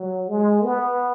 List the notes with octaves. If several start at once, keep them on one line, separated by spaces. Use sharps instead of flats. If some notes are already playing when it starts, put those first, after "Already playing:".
Already playing: F#3
G#3
B3